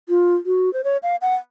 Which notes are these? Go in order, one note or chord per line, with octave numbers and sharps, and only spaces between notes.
F4
F#4
C5
C#5
F5
F#5